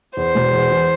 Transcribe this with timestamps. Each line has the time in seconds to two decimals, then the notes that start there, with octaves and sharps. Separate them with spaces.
0.17 E2 C5
0.35 E1
0.53 E2
0.71 E3